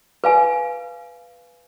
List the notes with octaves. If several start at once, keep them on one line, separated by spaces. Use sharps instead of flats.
B4 F5 G#5